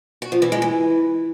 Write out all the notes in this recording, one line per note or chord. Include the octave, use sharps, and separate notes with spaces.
F#4
F3
E3
G#3
E3